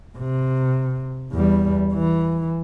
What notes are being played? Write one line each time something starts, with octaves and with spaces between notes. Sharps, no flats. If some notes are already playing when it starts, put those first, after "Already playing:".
C3
E2 G3
E3